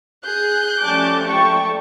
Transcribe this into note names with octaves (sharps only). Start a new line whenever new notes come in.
G#4 F#6 G6
F3 G3 A3 C#4 A5 D6
G5 A5 C#6